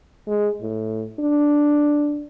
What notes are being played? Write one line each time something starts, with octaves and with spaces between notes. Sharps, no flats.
G#3
A2
D4